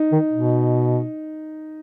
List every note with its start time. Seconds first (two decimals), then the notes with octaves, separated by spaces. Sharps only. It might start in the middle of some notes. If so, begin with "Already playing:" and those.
Already playing: D#4
0.12 D#3
0.32 B2